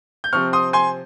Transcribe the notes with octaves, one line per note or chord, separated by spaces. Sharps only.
G6
C3 F3 C4 C#6 F6
C6 D#6
G#5 C6